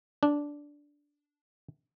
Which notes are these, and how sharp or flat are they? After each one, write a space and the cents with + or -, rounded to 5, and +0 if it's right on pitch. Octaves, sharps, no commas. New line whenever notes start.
D4 -10